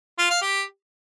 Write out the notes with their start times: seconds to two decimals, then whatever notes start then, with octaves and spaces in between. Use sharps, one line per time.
0.19 F4
0.30 F5
0.42 G4